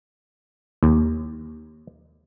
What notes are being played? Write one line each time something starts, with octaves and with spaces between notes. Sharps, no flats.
D#2